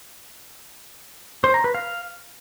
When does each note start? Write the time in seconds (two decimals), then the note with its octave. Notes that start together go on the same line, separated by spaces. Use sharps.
1.44 C5
1.54 A#5
1.64 B4
1.75 F5